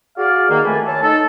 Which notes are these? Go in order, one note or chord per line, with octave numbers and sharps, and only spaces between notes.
F#4 G#4 D5 F5
D#3 A#3
F2 A3 B4 G#5 A5
C#5 A5
D#4 A4